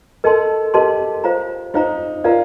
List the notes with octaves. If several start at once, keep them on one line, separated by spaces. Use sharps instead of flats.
A4 A#4 D#5 A5 C6
G4 A#4 D#5 A5 C6
F4 C5 F5 A#5
D#4 F4 C5 F5 A#5
F4 A#4 D5 F5 A#5